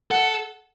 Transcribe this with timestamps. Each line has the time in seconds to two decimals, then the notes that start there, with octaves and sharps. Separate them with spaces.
0.11 A4 F#5